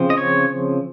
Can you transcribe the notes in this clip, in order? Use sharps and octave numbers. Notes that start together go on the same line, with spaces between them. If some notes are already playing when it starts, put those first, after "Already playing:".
Already playing: C#3 F3 C4
D#5
C#5